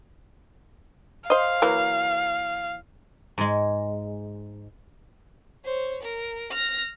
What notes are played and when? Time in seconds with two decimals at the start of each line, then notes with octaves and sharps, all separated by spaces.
1.30 C5 D#5 F5
1.62 E3 F#3 A#3
3.38 G#2 G#3
5.65 C5 C#5
6.03 A#4
6.51 F6 A#6